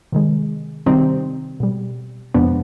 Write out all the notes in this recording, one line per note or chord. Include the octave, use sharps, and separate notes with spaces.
C3 D#3 G#3
C3 D#3 G3 C4 D#4
B2 G3
F2 C3 F3 G#3 B3 D4